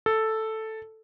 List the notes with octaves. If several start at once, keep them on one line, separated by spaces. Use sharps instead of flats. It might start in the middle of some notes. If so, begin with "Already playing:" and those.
A4